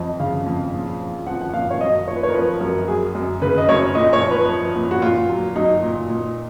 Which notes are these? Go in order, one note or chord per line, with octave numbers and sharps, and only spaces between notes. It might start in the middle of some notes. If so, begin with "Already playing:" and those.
Already playing: F2 F3 D#5
C#3 F5
F2
A#2
F3
F3 F#5
F#5
A#2 F5
C#5
F#2 D#5
F3 C#5
B4
C#5
A#4
F3 B4
F#2 A#4
F#3 G#4
F#2
C#3 B4
D#5
F#2 C#5
A#2 D#5
C#5
F3
B4
F3
A#2
F#4
A#2 F4
F#3
F#3 D#4
A#2
A#2